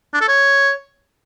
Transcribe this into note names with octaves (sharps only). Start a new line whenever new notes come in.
D4
A4
C#5